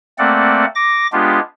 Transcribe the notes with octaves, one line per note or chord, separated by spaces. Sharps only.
A3 A#3 C4 D5 F#5
D6 A#6
G#3 B3 D4 F4 G4